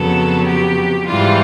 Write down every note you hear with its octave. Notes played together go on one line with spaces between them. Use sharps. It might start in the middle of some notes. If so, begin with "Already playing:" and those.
Already playing: F2 C#3 F#3 B3 A4
G4
G#2 E3 G3 F4